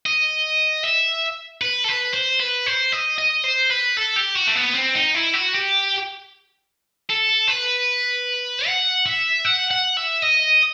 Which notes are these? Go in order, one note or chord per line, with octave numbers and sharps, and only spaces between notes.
D#5
E5
B4
A4
B4
C5
B4
C5
D#5
D#5
C5
B4
A4
G4
F#4
A3
B3
C4
D#4
E4
F#4
G4
A4
B4
F#5
E5
F#5
F#5
E5
D#5